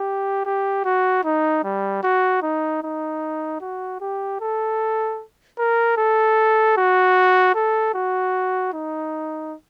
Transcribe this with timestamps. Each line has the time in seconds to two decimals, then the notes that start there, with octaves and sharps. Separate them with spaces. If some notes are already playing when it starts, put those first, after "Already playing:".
Already playing: G4
0.45 G4
0.84 F#4
1.24 D#4
1.64 G3
2.03 F#4
2.42 D#4
2.83 D#4
3.61 F#4
4.01 G4
4.40 A4
5.59 A#4
5.97 A4
6.77 F#4
7.55 A4
7.94 F#4
8.73 D#4